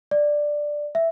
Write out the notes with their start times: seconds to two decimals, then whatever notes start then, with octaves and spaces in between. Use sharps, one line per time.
0.11 D5
0.95 E5